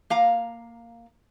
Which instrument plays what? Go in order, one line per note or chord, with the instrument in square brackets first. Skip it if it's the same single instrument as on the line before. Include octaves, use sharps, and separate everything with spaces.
[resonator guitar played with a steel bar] A#3 F5 A#5